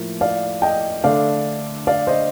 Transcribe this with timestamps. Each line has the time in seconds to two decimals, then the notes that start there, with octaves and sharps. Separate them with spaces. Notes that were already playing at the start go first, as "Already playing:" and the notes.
Already playing: A2 F3 A#3
0.21 D5 F5
0.62 D#5 G5
1.04 D3 A3 D4 D5 F5
1.87 D5 F5
2.07 C5 D#5